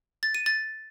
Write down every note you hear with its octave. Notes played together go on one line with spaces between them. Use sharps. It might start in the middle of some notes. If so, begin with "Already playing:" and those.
A6
D#7
A6